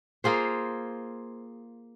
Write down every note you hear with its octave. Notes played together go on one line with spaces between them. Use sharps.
A#3 F4 G#4 C5